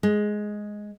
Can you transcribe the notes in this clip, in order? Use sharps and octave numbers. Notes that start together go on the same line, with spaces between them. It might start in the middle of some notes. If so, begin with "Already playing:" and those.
G#3